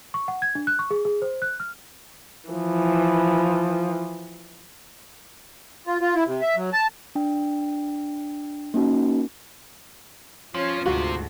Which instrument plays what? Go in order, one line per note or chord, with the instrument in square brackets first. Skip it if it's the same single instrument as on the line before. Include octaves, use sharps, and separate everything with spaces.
[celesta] C#6
F#5
G#6
D4
F#6
C#6
G#4
G#4
C5
F#6
F6
[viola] E3 F3
[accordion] F4
F4
E4
C3
E5
F#3
A5
[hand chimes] D4 G5
A#3 C#4 D#4 F#4 A#4
[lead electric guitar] F3 [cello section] C#4 C#5 [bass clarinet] F4
[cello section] D2 G#2 [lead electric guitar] C3 [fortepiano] F#4